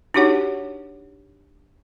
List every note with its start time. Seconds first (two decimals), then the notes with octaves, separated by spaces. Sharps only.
0.14 D4 D#4 F#4 G4 C#5 F#5